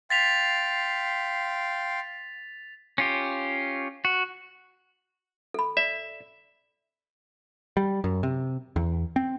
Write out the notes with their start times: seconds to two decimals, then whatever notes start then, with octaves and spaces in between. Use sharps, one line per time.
0.10 F5 G5 C6 A6 B6 F7
2.98 C#4 F4 G4
4.05 F#4
5.54 A4 B5
5.77 D5 E5
7.77 G3
8.04 F#2
8.23 C3
8.76 E2
9.16 C4